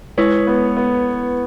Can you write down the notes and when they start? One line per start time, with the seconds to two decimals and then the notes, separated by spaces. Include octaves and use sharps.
0.18 G#3 E4 B4 C#5
0.47 B3
0.77 B3